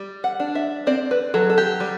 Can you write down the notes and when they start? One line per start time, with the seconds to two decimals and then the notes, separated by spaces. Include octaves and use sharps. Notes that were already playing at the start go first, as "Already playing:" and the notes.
Already playing: G3
0.24 F#5
0.40 D4
0.55 E5
0.87 C4 D5
1.11 B4
1.34 F#3 A4
1.50 A4
1.58 G4
1.80 G3